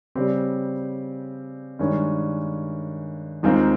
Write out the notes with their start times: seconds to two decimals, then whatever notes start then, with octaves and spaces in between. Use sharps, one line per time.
0.15 C#3 G3 C4 G4
1.79 G2 D#3 G#3 C#4
3.43 D#2 D#3 G#3 C4 F4